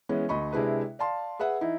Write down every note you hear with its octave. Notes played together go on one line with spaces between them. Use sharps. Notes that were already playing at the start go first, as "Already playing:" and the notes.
E3 G#3 B3 C#4
D2 D#5 B5 C#6
C3 G#3 D4 E4 G#4 B4
D5 F5 A5 C6
G#4 B4 E5 F#5
E3 D#4 E4